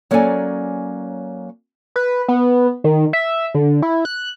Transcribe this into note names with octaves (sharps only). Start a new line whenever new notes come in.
F#3 A#3 C#4 A4 D5 G#5
B4
B3
D#3
E5
D3
E4
F#6